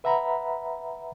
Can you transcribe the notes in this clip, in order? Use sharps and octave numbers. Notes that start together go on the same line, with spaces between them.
B4 E5 F#5 A#5 B5